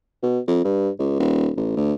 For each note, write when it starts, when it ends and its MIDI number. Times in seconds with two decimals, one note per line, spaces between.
0.23 0.39 47
0.48 0.61 41
0.65 0.89 43
0.99 1.19 37
1.19 1.50 27
1.57 1.74 33
1.77 1.93 38